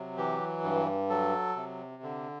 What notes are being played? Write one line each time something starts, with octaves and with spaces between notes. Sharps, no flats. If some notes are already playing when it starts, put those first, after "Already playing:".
Already playing: C3 F#3
E3 G4
G2
F#3 A4
C3
D3